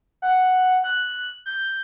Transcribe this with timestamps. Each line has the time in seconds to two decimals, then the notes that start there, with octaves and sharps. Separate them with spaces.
0.22 F#5
0.84 F#6
1.46 G6